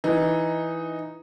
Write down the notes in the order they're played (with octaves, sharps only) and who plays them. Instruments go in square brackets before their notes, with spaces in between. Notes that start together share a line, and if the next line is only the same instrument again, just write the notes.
[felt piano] E3 [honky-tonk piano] D#4